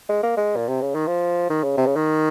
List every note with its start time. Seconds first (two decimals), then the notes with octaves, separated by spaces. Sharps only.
0.09 G#3
0.23 A#3
0.37 G#3
0.56 A#2
0.68 C3
0.82 C#3
0.95 D#3
1.07 F3
1.50 D#3
1.63 C#3
1.77 C3
1.86 C#3
1.96 D#3